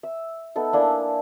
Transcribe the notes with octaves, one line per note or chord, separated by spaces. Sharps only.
E5
B3 D#4 A4 E5
A#3 D4 E4 G#5